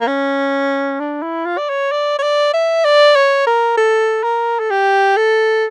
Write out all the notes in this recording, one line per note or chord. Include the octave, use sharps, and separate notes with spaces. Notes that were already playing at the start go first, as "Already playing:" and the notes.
A#3
C#4
D4
E4
F4
D5
C#5
D5
C#5
D5
E5
D5
C#5
A#4
A4
A#4
A4
G4
A4